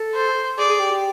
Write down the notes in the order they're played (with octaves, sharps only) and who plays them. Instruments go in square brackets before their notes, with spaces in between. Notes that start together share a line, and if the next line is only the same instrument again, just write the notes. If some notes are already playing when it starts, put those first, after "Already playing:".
Already playing: [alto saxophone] A4
[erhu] C5
[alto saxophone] G#4 [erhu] D5
[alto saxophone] G#4
G4
G4